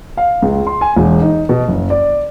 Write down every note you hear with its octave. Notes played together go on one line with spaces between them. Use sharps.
F5
C#2
C6
G#5
E1
D#4
B2
F#1
D5